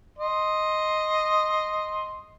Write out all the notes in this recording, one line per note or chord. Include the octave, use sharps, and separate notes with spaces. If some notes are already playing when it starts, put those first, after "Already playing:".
D#5 C6